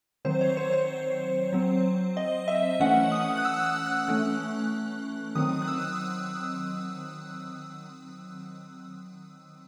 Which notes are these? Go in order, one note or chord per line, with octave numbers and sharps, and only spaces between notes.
D#3 F#3 C4 C5
C#5
C5
C5
F#3 C4
D#5
E5
E3 A3 C#4 F#5
D#6
F#6
E6
F#6
F#6
E3 A3 C#4 F#6
D#3 F#3 C4 D#6
F#6
E6